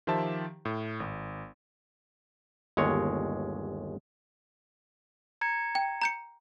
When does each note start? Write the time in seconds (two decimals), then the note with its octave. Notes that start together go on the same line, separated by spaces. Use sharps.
0.07 D#3 F3 G4 C5 E5 A5
0.65 A2
1.00 G#1
2.77 G1 D#2 G#3 C#5
5.41 A#5 G#6 C#7
5.75 G5
6.02 A#5 G6 C#7